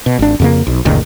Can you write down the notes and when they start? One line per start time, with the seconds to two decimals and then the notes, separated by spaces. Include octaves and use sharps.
0.06 B2
0.19 G#1 D4
0.40 F2 C#3 A#3
0.67 B1
0.85 F1 C#2 A#2 D#3